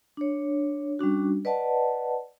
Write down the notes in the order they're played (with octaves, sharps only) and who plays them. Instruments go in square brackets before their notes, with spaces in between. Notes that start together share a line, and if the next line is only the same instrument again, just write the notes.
[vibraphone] D4 C#5
G3 C#4 D4 F#4
B4 D5 D#5 F#5 A5